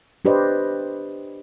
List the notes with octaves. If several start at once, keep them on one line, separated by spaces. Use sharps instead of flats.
D4 G4 B4 C5 D5 D#5